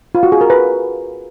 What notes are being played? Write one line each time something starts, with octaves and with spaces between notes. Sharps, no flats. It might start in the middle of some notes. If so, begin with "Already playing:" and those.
F4
F#4
G#4
A#4
B4